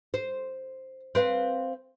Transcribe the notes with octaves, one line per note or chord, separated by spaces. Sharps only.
C5
C4 B4 F5